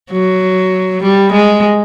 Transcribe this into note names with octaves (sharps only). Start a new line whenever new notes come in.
F#3
G3
G#3